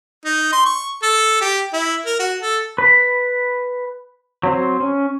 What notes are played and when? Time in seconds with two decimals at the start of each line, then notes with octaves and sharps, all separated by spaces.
0.25 D#4
0.52 C6
0.65 C#6
1.03 A4
1.41 G4
1.73 E4
2.06 A#4
2.19 F#4
2.42 A4
2.78 B4 B5
4.43 F#3 C4 C5
4.80 C#4